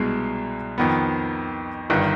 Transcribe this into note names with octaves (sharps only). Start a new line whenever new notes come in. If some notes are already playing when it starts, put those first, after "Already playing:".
Already playing: C2 B2 G#3
F2 D#3 B3
G1 G2 D#3